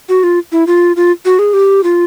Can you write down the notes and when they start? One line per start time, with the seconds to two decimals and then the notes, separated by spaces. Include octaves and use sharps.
0.09 F#4
0.23 F4
0.52 E4
0.67 F4
0.96 F4
1.25 F#4
1.39 G#4
1.53 G4
1.84 F4